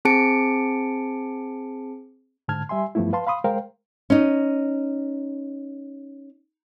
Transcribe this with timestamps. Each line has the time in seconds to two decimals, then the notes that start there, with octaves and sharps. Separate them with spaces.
0.05 C4 G#4 A5 C#7 D7
2.48 G#2 D3 A5 F6 G#6
2.69 G3 E5 G#5 C6
2.95 G2 F3 G3 A3 B3 E4
3.13 B4 F5 A5 C6
3.27 F5 B5 C6 D#6
3.44 G#3 A#4 C5 F5 G5
4.10 C#4 D#4